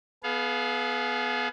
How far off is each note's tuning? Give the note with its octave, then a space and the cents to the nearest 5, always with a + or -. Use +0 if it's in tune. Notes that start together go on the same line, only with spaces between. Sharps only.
B3 +0 G#4 +40 F5 +0